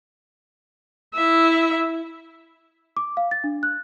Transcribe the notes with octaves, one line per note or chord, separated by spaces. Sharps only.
E4 E5
D6
F5
A6
D4
F#6